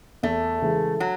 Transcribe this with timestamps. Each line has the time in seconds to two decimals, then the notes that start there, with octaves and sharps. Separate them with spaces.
0.23 E2 A3
0.62 C#3 E3 G#3
1.00 F#3